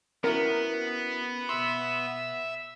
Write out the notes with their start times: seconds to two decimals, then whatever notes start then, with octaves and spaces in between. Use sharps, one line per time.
0.24 B3 C#4 E4 F#4 A#4
1.49 B2 E5 C6 E6